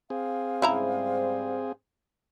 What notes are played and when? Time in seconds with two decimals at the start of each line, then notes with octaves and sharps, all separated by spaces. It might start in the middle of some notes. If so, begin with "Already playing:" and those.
0.10 C4 G#4 F5
0.62 G#2 C#3 G3 E4 C5 A#5